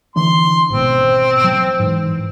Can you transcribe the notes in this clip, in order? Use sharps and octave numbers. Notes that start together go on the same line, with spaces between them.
D3 E3 D4 C6
G#1 B2 C4
F#3
G#2 E3